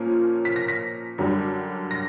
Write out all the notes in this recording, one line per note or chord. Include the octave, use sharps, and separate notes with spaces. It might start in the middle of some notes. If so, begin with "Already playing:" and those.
Already playing: A#2 F3 A#3 C#4
B6
A#6
B6
F#2 D3 G3
A#6